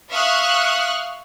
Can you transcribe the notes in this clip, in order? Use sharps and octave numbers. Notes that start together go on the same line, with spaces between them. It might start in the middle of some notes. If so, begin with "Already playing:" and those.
E5 F5 C#6 D#6 F6 F#6